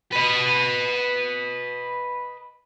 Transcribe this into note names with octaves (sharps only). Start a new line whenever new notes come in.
B4 D#5